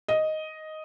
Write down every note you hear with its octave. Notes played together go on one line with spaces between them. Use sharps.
D#5